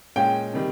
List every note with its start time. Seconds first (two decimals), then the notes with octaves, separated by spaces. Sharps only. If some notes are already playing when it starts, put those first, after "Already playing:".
0.16 A#2 G#3 C#4 G5
0.53 C3 D#3 G3